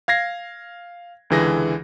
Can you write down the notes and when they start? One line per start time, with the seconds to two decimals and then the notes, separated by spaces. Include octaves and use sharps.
0.08 F5 G#6 A#6 C7
1.30 C#2 D3 E3 G#4 A#6